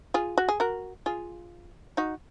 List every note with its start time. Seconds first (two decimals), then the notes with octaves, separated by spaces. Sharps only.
0.14 F4 G#4
0.38 F#4
0.48 G#4
0.60 F#4 A#4
1.06 F4 G#4
1.97 D#4 F#4